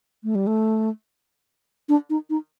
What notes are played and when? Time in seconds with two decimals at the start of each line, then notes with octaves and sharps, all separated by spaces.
0.24 A3
0.35 G3
0.47 A3
1.89 D4
2.10 D#4
2.30 D#4